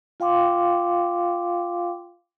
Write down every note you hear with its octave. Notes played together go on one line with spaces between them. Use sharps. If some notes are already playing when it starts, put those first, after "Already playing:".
F4 F5 G5 C6 D6